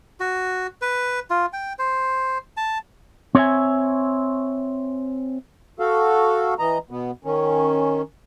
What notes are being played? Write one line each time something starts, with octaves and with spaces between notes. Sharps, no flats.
F#4
B4
F4
G5
C5
A5
C4 C#5 D5 E5 G#5
F#4 A4 F5
E3 D#5 A#5
B2 B3
D#3 C#4